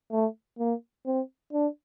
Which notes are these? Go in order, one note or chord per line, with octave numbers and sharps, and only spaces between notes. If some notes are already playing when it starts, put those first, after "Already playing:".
A3
A#3
C4
D4